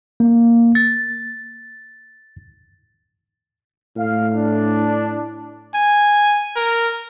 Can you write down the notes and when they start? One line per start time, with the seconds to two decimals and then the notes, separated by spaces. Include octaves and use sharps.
0.20 A#3
0.75 A6
3.96 A2 F5
4.32 D4
5.74 G#5
6.56 A#4